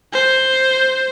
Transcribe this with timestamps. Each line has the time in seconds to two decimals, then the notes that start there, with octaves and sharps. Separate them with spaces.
0.13 C5